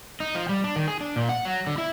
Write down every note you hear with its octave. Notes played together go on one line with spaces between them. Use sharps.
D#4
F3
G3
D4
D#3
G#4
D4
A#2
F#5
F#3
D3
E4